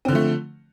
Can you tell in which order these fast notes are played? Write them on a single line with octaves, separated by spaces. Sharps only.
C4 D3 F3 A3